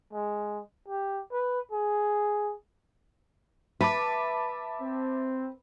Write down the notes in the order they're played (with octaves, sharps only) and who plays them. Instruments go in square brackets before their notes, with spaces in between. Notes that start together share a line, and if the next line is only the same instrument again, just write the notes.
[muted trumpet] G#3
G4
B4
G#4
[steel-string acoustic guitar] B4 [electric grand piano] E5 A5 D6
[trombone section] C4